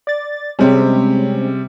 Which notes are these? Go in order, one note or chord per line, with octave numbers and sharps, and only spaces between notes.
D5 A6
C3 G3 G#3 C4 C#4